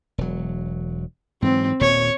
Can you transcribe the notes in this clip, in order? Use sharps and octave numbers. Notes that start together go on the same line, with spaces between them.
E1 F#3
G#2 E3 F#3 C4
D#1 A#2 D#3 C#5